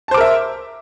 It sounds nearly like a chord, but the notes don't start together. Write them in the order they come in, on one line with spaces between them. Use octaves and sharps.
A5 C5 D6 A#4 E5